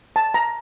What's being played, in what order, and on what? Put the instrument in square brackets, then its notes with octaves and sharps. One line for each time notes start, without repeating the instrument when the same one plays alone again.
[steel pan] A5
A#5